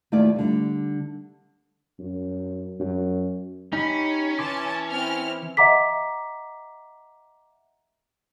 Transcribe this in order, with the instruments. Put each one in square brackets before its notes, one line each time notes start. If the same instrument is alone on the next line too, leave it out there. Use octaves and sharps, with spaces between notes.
[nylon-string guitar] D#2 A3 E4 F4 D5
D3 G3
[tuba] F#2
F#2
[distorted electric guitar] C#4 [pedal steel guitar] D#4 G4 B5
[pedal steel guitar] E3 C6 D6 [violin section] A5
[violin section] C4 E4 F6
[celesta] D#5 E5 F#5 A#5 D6 B6